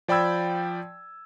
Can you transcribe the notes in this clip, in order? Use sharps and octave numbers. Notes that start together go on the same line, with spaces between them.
F3 D5 G5 B5 E6 G#6